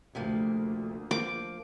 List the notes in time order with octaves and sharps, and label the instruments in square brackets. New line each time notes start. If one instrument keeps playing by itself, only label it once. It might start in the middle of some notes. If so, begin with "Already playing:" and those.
[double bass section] D2 [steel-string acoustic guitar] C3 F3 A#3
[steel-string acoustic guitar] F3 A#3 [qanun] D6